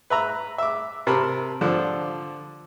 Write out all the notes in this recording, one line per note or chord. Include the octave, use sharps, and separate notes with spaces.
B4 E5 A#5
E5 D6
C3 A#4 A5 B5
D3 F3 D4